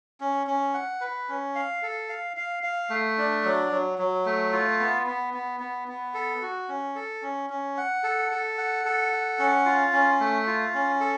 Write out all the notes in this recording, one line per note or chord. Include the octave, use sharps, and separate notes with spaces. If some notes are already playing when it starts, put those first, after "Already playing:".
C#4
C#4
F#5
B4
C#4
F5
A4
F5
F5
F5
A3
D4
F#3
F#3
F#3
A3
F4
B3
B3
B3
B3
B3
A4
F#4
C#4
A4
C#4
C#4
F#5
A4
A4
F#5
A4
F#5
C#4
F4
C#4
A3
F4
C#4
A4